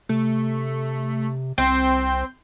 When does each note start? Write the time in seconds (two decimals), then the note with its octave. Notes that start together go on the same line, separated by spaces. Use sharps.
0.09 C3 A3
1.58 C2 C4 G6